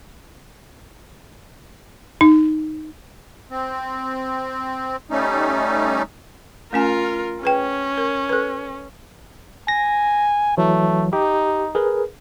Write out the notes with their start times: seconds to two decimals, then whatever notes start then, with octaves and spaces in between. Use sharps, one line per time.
2.21 D#4
3.51 C4
5.11 G3 A3 C#4 D#4
6.73 A3 C#4 F4 A#4 G#5
7.43 C#4 G#4 B4 G5
7.98 A#4
8.29 A4 B4
9.68 G#5 A#6
10.58 E3 F#3 A3
11.13 D#4 G4
11.75 G#4 A#4 B4